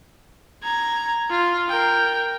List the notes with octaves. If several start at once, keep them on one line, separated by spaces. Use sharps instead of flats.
A#5 G#6
F4
A#4 G5